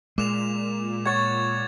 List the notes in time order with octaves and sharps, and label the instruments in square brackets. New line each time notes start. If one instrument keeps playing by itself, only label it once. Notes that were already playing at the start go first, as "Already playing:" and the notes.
[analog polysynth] A#2 [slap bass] G#3 [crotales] D6 E7 F7
[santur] C#5 F#5 C#6 [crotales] G#6 A6